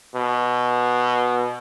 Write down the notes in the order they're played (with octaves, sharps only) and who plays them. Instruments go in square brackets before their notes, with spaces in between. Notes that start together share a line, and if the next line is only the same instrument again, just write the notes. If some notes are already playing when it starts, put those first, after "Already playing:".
[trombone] B2